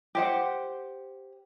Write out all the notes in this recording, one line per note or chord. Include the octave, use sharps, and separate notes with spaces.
G4 C5 F#5